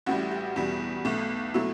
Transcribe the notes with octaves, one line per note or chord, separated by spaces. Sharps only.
A1 A2 G3 F#4
G4
E2 B2 G3 F#4
B1 B2 A3
B2 F#3 A3 E4